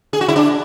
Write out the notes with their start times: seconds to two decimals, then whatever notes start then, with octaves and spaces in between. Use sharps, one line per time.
0.13 G#4
0.21 F#4
0.28 E4
0.36 D4